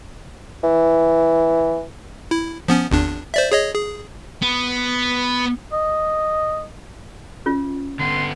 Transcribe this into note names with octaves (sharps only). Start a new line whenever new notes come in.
E3
E4
F3 B3 C#4
G#1 E2 D4
C5 D5 E5
G#4 C#5 D#5
G#4
B3
D#5
C#4 F4
D3 B3 C6